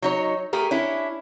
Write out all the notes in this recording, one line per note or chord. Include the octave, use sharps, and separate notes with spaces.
F#3 D#4 C#5
A3 G4 G#4 A#4
C#4 D4 E4